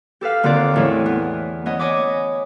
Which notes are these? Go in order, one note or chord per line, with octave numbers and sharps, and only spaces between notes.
G4 A4 B4 F5
D#2 D3 C4 F4 A#4 D5
E2 A2 E3
B3
B3 C#4 D#5
C#5 D#5 G#5 B5 D6